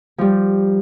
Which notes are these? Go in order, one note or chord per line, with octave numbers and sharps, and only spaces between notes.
F3 G3